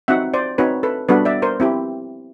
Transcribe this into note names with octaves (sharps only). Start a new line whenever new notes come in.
C4 D#4 F#4 E5 F#5
C5 D5
C4 D#4 F#4 B4 C#5
A4 B4
G3 B3 D4 F#4 A4 B4
D5 E5
A#4 C5
C4 E4 G4